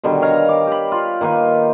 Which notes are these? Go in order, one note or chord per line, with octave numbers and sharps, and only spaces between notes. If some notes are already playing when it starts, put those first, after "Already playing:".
B2 D3 D#3 G3
C#5 F5 A#5
D6
G4 B5
F4
D#3 A#3 F4 B4